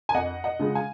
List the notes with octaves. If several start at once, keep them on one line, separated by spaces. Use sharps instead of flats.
G#5
F2 D#5 F#5
D#5 F#5
C#3 F3 G#3
F5 G#5